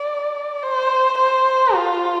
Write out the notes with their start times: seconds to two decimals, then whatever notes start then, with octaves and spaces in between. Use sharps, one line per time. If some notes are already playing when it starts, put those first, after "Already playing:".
Already playing: D5
0.63 C5
1.18 C5
1.74 F4